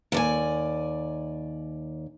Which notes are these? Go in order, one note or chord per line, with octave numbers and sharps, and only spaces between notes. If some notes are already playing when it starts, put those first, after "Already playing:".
D#2 D5 G#5